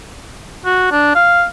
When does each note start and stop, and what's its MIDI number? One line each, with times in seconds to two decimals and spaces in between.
0.65 0.87 66
0.91 1.13 62
1.15 1.45 77